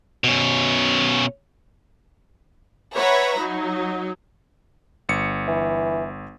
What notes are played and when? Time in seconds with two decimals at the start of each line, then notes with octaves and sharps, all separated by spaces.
0.24 B2 C#4
2.96 B4 C#5 E5 F#5 A#5 B5
3.40 F#3 D#4
5.09 G1 C#7
5.48 E3